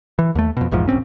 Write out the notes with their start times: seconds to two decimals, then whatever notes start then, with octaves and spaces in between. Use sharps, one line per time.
0.19 E3
0.35 D#2 A3
0.57 F2 B2
0.71 A#1 E2 G#2 F3
0.88 D1 A#1 C4 C#4